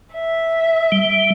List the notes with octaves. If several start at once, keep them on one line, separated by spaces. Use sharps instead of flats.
E5
G3